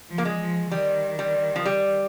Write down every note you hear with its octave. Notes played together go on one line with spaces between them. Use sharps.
F3
A#3
G#3
F3
D#3 G3
G3
F3
G3